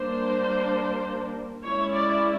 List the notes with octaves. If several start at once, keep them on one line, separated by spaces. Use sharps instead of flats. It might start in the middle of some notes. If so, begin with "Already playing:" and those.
Already playing: G3 A#3 D4 C5
G#3 C#4 E4 C#5
D5